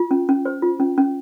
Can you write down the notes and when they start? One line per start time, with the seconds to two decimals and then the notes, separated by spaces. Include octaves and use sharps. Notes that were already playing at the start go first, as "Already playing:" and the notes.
Already playing: F4
0.11 C#4
0.29 C#4
0.45 C5
0.62 F4
0.80 C#4
0.98 C#4